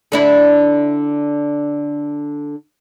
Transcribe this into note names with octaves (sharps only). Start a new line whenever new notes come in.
D3 D4 E4